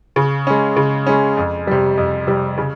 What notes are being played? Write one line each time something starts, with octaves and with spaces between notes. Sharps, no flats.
C#3
G#3 C#4
C#3
G#3 C#4
F2
C3 G3
F2
C3 G3
C#3